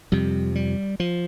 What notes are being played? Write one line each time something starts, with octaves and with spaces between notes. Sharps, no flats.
F2 C3 G3
G3
F3